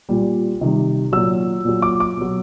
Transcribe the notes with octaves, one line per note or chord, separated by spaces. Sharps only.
A#2 G3
C3 D#3 G3
A#2 F#3 E6
A#2 F#3
D6
D6
B2 F#3